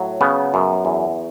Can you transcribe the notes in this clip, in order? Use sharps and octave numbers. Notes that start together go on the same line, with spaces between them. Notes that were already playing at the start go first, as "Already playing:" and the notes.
Already playing: A2 F#3
C#3 B3
F#2
E2